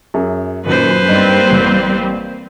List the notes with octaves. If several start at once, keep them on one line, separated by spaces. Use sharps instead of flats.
F#2 G#4 E5
F#2 A#2 D#3 B4 C5
G2 G3 A#3 C4 D#4
A1